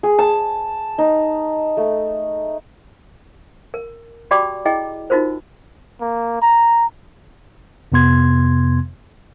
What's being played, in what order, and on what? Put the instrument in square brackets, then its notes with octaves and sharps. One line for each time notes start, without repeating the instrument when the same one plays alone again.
[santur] G#4
A5
D#4
A3
[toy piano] A#4
F#4 G4 D5 G5 B5 D6
E4 G#4 D#5 G5
D#4 F4 F#4 A#4 C5
[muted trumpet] A#3
A#5
[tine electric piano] F2 C3 B3 C6 G#6